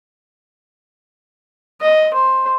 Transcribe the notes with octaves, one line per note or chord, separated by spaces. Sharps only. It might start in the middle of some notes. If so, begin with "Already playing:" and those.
D#5
C5